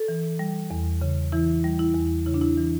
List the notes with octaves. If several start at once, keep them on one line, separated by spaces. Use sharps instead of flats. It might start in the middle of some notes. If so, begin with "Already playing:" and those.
Already playing: A4
E3
G3
E2
C#3
E3 E4
G3
E4
E2
C#3 E4
D4
E4
E3